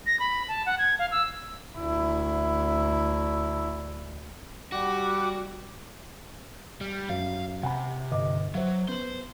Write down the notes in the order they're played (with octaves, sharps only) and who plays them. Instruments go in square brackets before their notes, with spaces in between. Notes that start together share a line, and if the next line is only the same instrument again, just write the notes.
[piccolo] A#6
B5
A5
F#5
G#6
F5
E6
[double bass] D2 E4
[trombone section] G3 [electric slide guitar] F#4 [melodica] G4 D6
[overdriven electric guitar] G3
[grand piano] F#2 [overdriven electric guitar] F5
[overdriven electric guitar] C3 [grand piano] F#5 G#5 B5
[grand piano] G1 D#5 D6
[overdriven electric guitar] F#3 [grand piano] C5 E5
[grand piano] B3 F#7 [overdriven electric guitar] C5